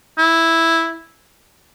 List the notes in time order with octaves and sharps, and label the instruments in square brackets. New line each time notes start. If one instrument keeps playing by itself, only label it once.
[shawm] E4